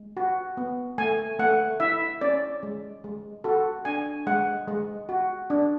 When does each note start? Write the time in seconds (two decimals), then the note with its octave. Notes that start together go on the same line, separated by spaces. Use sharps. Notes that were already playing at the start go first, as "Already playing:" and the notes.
Already playing: G#3
0.17 F#4
0.57 B3
0.98 A3 G#5
1.39 A3 F#5
1.80 E4 E5
2.21 C#4 D5
2.63 G#3
3.04 G#3
3.44 F#4 A4
3.85 D4 G#5
4.27 G#3 F#5
4.68 G#3
5.09 F#4
5.50 D4